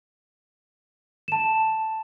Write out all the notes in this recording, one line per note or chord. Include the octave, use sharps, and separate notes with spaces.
A5 E7